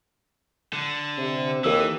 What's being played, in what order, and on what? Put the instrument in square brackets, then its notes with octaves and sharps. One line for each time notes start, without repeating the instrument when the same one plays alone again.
[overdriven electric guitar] D3
[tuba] C3
[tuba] D#2 [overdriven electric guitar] E3 [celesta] A4 A#4 E6